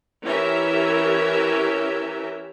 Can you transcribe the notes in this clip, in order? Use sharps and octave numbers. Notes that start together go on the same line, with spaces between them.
E3 C#4 G4 A#4 E5